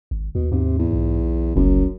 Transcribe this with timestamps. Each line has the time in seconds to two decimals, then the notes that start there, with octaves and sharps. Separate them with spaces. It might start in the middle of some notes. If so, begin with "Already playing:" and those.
0.11 G#1
0.35 D#2 B2
0.52 G#2 C3
0.78 E2
0.93 B1
1.56 F#1 C2 F#2